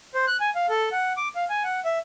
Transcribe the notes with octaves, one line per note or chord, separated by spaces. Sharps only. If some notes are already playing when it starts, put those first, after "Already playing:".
C5
F#6
G#5
F5
A4
F#5
D6
F5
G#5
F#5
E5